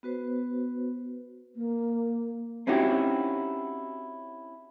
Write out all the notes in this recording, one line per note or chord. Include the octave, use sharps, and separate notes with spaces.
B3 F#4 B4 C5
A#3
C4 C#4 D#4 E4 F#4 G4